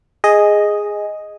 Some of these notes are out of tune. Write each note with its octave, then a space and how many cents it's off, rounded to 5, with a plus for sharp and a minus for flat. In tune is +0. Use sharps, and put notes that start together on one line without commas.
G#4 -5 D#5 +0